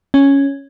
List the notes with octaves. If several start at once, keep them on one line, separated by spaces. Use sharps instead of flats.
C#4